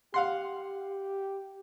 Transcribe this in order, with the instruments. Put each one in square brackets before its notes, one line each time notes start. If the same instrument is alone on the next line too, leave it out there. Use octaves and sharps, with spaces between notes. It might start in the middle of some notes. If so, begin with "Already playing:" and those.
[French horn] G4 [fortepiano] F5 F#5 C6